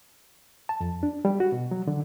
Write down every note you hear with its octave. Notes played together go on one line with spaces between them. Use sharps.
A5
F2
D4
G3
F#4
B2
F#3
D3